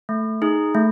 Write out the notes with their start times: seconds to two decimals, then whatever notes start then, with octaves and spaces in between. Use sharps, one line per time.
0.09 A3
0.42 D#4 G#4
0.75 A3